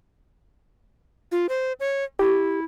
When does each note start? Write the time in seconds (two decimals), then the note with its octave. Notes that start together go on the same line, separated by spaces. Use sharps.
1.32 F4
1.49 C5
1.80 C#5
2.19 E4 G4